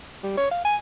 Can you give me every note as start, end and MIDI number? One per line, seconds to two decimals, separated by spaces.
0.23 0.34 55
0.37 0.50 73
0.51 0.65 77
0.65 0.76 80